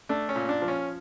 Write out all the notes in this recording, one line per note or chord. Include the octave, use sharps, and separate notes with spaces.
A3 D4
C#4
A#2
D4
F3
C#4